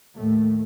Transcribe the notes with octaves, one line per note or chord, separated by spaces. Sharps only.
D#2 A2 A3